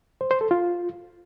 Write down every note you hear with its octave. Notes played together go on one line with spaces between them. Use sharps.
C5
C5
A4
F4